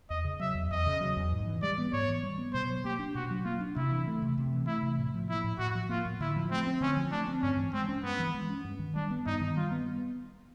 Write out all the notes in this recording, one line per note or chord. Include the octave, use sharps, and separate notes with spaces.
E2 D#5
C#3
F#3 E5
E2
E2 D#5
C#3
F#3
E2
G#2
E3
G3 D5
B3
G#2 C#5
E3
G3
B3
B2 C5
F#3
A#3 G4
D4
B2 F#4
F#3
A#3 F4
D4
C3 E4
E3
A3
C3
C3
E3
A3 E4
C3
A2
F3
A#3 E4
A2
A2 F#4
F3
A#3 F4
A2
D3 E4
F3
A3 C4
C4
D3 C#4
F3
A3 D4
C4
G2 C#4
E3
G#3 C4
C#4
G2 B3
E3
G#3
C#4
G2
D#3
G3 D4
B3
G2 D#4
D#3
G3 F4
B3